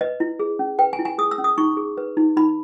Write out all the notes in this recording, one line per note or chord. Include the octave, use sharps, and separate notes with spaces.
B4 D#5
E4
G#4
C#4
B4 G5
G#5
E4
G#5
G#4 D#6
E6
C#4
D#6
D#4 C#6
G#4
B4
D#4
D#4 B5